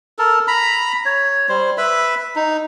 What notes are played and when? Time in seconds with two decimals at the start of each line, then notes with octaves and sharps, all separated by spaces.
0.19 A4 A#4
0.47 A#5 B5
1.05 C#5
1.49 G3 C5
1.78 B4 E5 B5
2.36 D#4